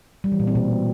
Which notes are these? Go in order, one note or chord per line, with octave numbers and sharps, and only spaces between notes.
G3
E3
A#2
C4
B2